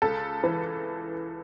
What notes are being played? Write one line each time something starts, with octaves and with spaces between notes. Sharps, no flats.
C#2 A4
E3